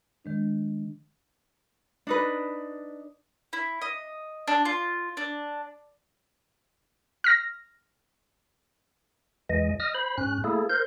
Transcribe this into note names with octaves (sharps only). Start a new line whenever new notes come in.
D#3 G#3 D4
D4 D#4 B4
E4
D#5
D4
F4
D4
F6 A#6
E2 E3 G#3 D#5
D#5 D#6 F6
C5 B5
G#2 C#4 F#6
A3 A#3 E4 G#4 A4
A#4 C5 G6